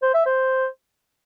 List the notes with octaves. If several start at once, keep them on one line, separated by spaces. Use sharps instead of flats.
C5
E5
C5